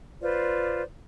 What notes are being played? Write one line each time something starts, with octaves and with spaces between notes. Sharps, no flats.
F4 B4 C5 D5